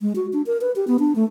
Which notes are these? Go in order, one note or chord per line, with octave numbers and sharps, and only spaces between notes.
G#3
F#4
D4
A#4
B4
G4
B3
D4
A3